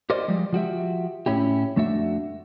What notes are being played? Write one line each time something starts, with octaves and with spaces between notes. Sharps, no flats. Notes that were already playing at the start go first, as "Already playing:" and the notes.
G4 A#4 C5 D5 D#5
F3 G3 G#3
F3 F#4 G4 E5
A2 C#4 E4 G4
F2 A3 D4 F#4 E5